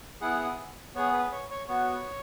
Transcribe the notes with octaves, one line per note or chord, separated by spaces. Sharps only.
B3 E4 G#4 F#5
B3 G#4 C#5
B4
C#5
C#5
B3 F#4 C#5